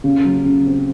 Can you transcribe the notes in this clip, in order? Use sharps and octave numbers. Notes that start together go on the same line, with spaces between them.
C#3
F#3
C#3
C4